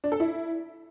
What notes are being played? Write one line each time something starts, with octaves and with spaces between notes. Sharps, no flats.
D4
A4
E4